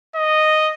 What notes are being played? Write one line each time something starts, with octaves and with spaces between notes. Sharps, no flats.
D#5